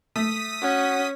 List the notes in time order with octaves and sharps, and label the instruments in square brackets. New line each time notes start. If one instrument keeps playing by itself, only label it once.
[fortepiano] A3 [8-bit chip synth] D#6 B6
[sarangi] C#4 [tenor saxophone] F#4